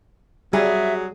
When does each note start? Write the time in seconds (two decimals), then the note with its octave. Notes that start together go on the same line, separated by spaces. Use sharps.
0.53 F#3 G3 G#4 E5